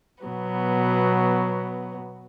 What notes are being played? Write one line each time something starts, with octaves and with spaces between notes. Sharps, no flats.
B2 F#3 B3